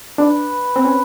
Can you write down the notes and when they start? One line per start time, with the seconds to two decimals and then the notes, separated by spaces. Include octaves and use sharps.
0.18 D4 B4
0.76 C4
0.85 C#4